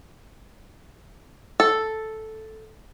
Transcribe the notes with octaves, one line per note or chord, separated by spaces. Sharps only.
A4